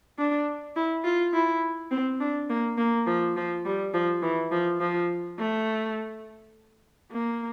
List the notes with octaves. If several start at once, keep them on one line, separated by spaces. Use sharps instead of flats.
D4
E4
F4
E4
C4
D4
A#3
A#3
F3
F3
G3
F3
E3
F3
F3
A3
A#3